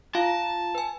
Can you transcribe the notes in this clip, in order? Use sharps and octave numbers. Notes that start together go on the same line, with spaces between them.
F4 F5 A5
B4 G#5